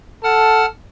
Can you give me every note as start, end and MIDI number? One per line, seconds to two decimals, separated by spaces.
0.24 0.67 69
0.24 0.66 78
0.24 0.66 81
0.24 0.66 89